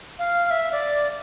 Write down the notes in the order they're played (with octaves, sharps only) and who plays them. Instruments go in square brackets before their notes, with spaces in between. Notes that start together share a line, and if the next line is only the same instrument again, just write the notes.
[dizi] F5
F5
E5
D5